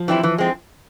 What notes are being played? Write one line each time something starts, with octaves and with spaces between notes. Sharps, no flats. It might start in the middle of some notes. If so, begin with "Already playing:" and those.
Already playing: F3
E3 G3 C4 E4
E3
G#3 C4